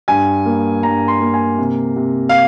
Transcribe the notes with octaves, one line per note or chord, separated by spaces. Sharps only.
G2 G#5
A#3
G2 A#5
C6
A#3
G#5
C3
C3
F5